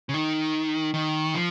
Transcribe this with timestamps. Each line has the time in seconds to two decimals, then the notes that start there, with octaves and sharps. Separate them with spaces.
0.09 C#3
0.14 D#3
0.94 D#3
1.34 F3